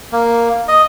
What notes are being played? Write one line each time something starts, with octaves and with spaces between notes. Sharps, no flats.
A#3
D#5